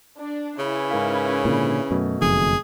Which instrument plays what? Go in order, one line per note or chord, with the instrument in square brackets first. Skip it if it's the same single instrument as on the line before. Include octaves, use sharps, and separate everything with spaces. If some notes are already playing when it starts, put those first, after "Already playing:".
[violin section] D4
[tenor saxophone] C#3 [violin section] C#4 E4 B4
[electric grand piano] G#2 A#4 F5
[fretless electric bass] A#2 D3
[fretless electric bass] F#2 [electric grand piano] B2 A3
[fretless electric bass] F#1 F2 D#3 [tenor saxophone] G#4